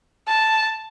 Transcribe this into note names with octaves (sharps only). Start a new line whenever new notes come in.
A5